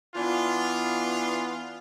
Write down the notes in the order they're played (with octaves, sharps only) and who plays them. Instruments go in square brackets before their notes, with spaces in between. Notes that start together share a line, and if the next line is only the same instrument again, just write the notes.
[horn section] E3 B3 D4 F4